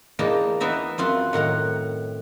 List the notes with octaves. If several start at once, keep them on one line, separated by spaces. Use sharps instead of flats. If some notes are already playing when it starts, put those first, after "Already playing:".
E2 A#3 D#4 G5 A5
E3 B3 D#4 E5 A#5
F#2 C4 F4 F#5
A2 D#3 F#5 A#5